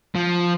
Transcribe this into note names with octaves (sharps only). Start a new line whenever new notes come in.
F3